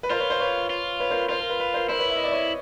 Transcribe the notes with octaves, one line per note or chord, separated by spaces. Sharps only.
B4
F4 A#4 C5
B4 C#5
A#4 C5
B4 C#5
F4
B4 C#5
A#4 C5
B4
F4 A#4 C5
A#4
B4
B4
A#4 C5
E4 A#4 C5
B4 C#5
E5
D#5
D5
C#5 D#5